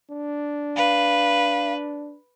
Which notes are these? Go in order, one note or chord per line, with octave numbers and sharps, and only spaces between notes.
D4
B4 F5